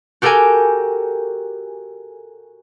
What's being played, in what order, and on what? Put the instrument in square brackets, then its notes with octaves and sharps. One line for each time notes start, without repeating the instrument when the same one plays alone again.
[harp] F#4 G4 A4 A#4 G5 G#5